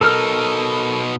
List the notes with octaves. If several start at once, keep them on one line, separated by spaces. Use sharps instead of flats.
B2 D#4 A4 A#4 F6